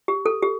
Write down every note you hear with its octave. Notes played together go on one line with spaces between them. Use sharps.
G4
A4
G4